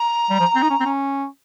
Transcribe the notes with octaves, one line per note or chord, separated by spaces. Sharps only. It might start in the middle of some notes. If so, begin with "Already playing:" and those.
Already playing: A#5
G3
F3
C4
D#4
C#4
C4
C#4